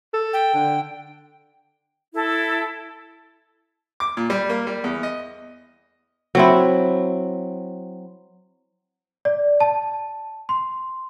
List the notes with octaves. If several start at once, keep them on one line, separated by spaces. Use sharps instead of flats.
A4
G5
D3
E4 A4
D6
A#2
G3
A#3
G3
E2
D#5
F#3 C4 E4
D5
A5
C6